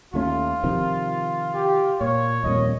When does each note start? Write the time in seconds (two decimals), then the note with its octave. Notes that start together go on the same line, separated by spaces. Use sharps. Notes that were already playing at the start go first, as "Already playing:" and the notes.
0.14 D#2 A3 C#4 F4
0.63 C3 D#3 F3
1.54 G4
2.01 A#2 C#5
2.44 D#1 F2 A#2 D#5